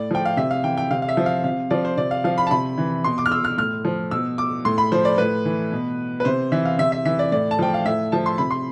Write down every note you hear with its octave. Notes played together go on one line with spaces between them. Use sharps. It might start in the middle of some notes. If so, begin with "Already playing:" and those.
Already playing: A2 D5
F3 G5
F5
C3 E5
F5
E3 G5
G5
C3 F5
F5
E5
F3
F5
C3 F5
F3 D5
C5
C3 D5
F5
F3 F5
B5
A5
C3 B5
E3
B2 C6
D6
F6
E6
F6
A2 F6
F3
B2 E6
D6
A2 C6
B5
F3 C5
D5
A2 B4
E3
B2
B4
C3 C5
E3 E5
F5
C3 E5
E5
E3 E5
D5
A2 D5
A5
F3 G5
F5
A2 E5
F3 A5
C6
C3 B5
C6